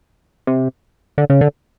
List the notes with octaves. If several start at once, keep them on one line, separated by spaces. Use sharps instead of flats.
C3
D3
C#3
D3